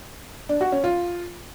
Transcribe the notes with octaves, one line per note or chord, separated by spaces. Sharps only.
D4
F#4
C#4
F4